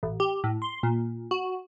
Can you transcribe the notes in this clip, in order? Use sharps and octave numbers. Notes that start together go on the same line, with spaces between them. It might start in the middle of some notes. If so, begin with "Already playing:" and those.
A1
G4
A2
C6
A#2
F#4